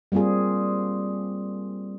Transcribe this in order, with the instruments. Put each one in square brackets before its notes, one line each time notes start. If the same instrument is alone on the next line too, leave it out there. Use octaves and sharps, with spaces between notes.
[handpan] G3 A#3 C4 F4 G#4